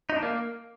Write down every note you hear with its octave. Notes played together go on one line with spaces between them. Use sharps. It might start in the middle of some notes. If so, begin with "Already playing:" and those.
D#4
D4
A#3